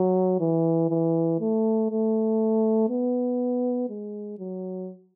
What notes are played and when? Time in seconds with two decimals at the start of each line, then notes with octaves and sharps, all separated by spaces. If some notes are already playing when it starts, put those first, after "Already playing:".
Already playing: F#3
0.40 E3
0.90 E3
1.40 A3
1.91 A3
2.89 B3
3.90 G#3
4.39 F#3